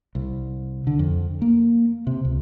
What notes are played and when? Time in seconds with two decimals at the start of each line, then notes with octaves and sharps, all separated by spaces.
0.15 C2
0.87 D3
0.99 F2
1.42 A#3
2.07 C3
2.25 C#2